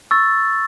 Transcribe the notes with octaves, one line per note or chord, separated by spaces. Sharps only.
C#6 E6 A6